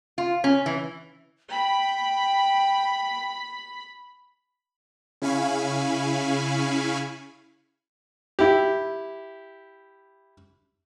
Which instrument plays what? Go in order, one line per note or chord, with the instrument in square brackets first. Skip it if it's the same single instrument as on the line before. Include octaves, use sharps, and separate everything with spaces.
[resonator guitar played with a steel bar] F4
C#4
E3
[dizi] G5 [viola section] B5
[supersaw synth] C#3 E4 F5 G#5 B5 C#6
[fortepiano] E4 G4